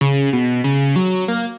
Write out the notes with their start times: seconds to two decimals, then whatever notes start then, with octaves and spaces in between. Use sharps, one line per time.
0.01 C#3
0.33 B2
0.64 C#3
0.96 F#3
1.28 A#3